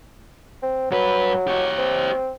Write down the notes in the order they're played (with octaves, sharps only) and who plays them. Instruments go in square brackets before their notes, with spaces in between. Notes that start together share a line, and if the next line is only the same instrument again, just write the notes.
[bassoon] C4
[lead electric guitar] G2 B4 [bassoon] F#3
[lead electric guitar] G4 C#5
[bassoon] C4